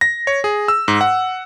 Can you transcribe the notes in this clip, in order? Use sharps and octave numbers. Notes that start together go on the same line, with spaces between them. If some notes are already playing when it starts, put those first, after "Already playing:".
A#6
C#5
G#4
E6
G#2
F#5